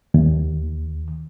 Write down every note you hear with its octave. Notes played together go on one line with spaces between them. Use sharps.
D#2